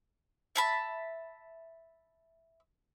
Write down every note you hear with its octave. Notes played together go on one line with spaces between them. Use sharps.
E5 A5 B5